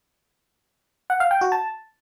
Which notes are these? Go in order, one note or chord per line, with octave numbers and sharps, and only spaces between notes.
F#5
F5
G5
F#4
A5